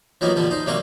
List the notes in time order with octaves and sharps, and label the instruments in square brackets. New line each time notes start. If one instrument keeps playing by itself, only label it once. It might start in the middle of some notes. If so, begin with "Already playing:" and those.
[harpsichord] F3 F#3 A#3 B3 D#4
A#2 D3 F3 G3
D#4 C5
C3 F#3 G3 A#3 C4 C#6